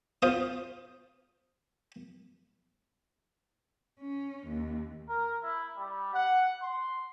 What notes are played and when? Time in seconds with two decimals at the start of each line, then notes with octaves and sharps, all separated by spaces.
0.22 F4 C5 D#6
4.00 C#4
4.48 D#2
5.09 A#4
5.43 E4
5.78 G3
6.14 F#5
6.63 C6